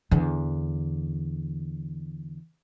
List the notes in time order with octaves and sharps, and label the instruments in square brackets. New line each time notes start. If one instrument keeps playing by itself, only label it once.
[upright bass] E2 D3